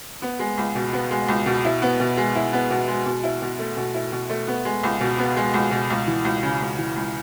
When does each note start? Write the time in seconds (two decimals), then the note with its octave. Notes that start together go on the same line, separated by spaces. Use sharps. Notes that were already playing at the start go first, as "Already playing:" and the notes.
0.22 B3
0.39 G#3
0.58 C#2
0.75 B2
0.93 B3
1.11 G#3
1.28 C#2
1.46 B2
1.65 E4
1.82 B3
2.00 B2
2.17 G#3
2.35 E4
2.53 B3
2.70 B2
2.88 G#3
3.06 B2
3.24 E4
3.42 B2
3.59 A3
3.77 B2
3.95 E4
4.12 B2
4.30 A3
4.48 B3
4.65 G#3
4.83 C#2
5.00 B2
5.18 B3
5.37 G#3
5.54 C#2
5.71 B2
5.90 C#2
6.07 E3
6.25 C#2
6.43 C#3
6.61 C#2
6.78 E3
6.96 C#2